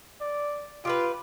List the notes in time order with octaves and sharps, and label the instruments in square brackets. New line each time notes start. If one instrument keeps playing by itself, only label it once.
[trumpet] D5
[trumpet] F4 [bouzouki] G4 G#4 B4